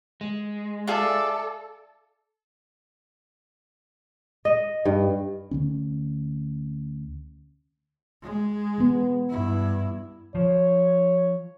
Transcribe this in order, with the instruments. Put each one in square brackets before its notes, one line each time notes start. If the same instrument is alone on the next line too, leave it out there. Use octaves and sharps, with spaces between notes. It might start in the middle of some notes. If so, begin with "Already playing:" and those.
[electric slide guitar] G#3
[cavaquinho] F4 G#4 E5 [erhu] A4 [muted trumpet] D5
[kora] D#5
G2
[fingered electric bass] D2 D3 C#4
[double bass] G#3
[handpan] E3 B3
[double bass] G2 E4
[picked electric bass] F3 [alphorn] C#5